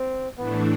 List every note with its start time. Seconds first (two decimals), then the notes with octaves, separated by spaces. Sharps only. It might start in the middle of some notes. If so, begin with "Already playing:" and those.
Already playing: C4
0.38 A2 E3 A3 B3 D4